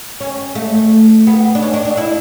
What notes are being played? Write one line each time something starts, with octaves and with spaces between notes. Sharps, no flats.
C#4
A3
B3
D4
C#4
D4
D4
E4